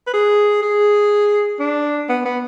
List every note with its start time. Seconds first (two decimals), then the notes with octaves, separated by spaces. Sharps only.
0.07 B4
0.14 G#4
0.62 G#4
1.59 D4
2.09 B3
2.25 B3